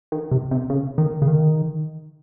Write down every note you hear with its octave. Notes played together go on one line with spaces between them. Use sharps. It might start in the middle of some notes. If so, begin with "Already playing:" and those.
D#3
C3
C3
C#3
D#3
C#3
D#3